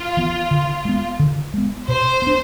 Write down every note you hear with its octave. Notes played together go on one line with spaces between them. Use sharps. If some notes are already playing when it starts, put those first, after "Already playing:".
Already playing: F4
E3 B3
D3
G#3 B3
D3
G#3 B3
B2 C5
B3 D4